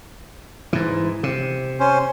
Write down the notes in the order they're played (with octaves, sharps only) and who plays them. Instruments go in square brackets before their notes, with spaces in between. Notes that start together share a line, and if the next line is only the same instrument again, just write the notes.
[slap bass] G#2 E3
C3
[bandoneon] C#4 C5